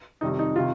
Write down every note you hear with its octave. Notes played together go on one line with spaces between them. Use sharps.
F2 C3 D#3 G3 D#4
D#4
C3 D#3 F4